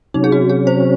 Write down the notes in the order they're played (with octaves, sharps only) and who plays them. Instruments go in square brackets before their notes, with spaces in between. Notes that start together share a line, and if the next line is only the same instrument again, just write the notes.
[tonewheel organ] C3 F#3 C#4 [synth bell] D#4
[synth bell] G#4
F#4
G#4
C5